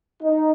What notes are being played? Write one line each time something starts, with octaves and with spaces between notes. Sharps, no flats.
D#4